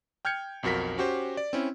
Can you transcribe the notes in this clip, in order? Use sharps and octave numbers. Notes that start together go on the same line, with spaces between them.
G5 F6 G6 G#6 C#7
B1 F2 F#4 A#4 B6
C#4 F#4 G4 C5
D5
C4 C#4 E4